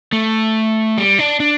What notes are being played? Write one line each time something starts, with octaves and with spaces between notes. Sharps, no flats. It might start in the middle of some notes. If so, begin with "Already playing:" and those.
A3
G3
D4
D4